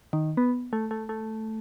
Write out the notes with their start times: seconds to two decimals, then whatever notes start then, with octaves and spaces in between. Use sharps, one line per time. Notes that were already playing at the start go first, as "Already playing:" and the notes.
0.13 D#3
0.37 B3
0.73 A3
0.91 A3
1.09 A3